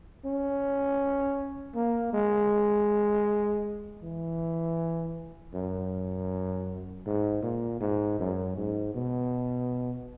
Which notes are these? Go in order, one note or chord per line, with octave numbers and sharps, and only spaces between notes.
C#4
A#3
G#3
E3
F#2
G#2
A#2
G#2
F#2
G#2
B2